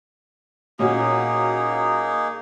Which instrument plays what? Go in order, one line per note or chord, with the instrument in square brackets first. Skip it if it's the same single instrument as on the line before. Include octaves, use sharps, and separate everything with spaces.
[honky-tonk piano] A#2 C#4 F#4 [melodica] A#3 D#4 G#4